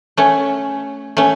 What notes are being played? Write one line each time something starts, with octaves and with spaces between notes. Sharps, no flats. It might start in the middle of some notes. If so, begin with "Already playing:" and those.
A3 C#4
A3 C#4